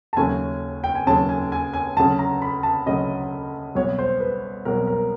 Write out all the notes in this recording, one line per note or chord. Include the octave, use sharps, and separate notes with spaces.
A5
D#2 C#3 F#3 A3 C#4 G#5
G5
G#5
D#2 C#3 F#3 A3 C#4 A5
G#5
G#5
G#5
D2 C#3 F#3 A5
A#5
B5
A5
D2 C#3 F#3 D#5
C2 B2 F#3 C#5
C5
B4
C2 B2 F#3 A#4
A#4